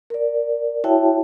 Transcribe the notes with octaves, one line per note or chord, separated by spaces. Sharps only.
A#4 D5
E4 F#4 C#5 E5 G5 A5